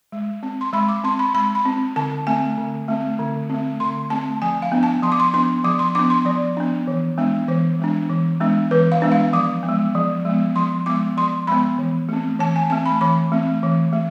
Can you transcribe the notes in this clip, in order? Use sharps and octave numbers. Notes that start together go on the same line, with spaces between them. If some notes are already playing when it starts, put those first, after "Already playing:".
G#3
C4
C6
G#3 B5
D6
C4 C6
B5
G#3 B5
B5
C4
D3 A5
A3 C4 G#5
D3
A3 C4
D3
A3 C4
D3 C6
A3 C4 A5
F3 G#5
F5
B3 D4
A5
F3 C6
D6
C6
B3 D4 C6
F3 D6
C6
B3 D4 D6
C6
F3 D5
B3 D4
E3
G#3 B3 D4
E3 C5
G#3 B3 D4
E3
G#3 B3 D4
E3 B4
F5
G#3 B3 D4
F5
F3 D6
B3
G#3
F3
G#3 B3
F3 C6
G#3 B3 D6
F3 C6
G#3 B3 B5
E3
A3 C4
E3 A5
G#5
A3 C4 A5
B5
E3 B5
A3 C4
E3
A3